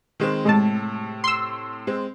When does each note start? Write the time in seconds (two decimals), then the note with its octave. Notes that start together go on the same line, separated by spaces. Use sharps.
0.20 D#3 G#3 C4
0.45 A2 C3 G#3 A5
1.24 C6 E6
1.87 G#3 C4